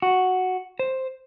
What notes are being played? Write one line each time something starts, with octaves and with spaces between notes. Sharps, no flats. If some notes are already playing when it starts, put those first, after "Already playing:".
F#4
C5